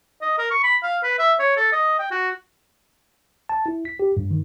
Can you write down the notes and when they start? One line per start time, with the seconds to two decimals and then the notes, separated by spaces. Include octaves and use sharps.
0.22 D#5
0.38 A#4
0.51 C#6
0.63 B5
0.83 F5
1.03 B4
1.19 E5
1.39 C#5
1.57 A4
1.72 D#5
1.99 G5
2.11 F#4
3.49 A5
3.66 E4
3.85 B6
4.00 G4
4.17 G2
4.31 D#3